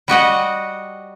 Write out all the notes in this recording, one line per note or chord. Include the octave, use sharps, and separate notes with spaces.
G3 F#4 D#5 F#5